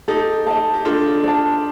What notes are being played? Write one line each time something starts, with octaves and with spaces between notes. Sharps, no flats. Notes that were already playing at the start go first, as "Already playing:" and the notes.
D#4 G4 A4
D#5 A5
G4
D4 F4 A4
D5 A5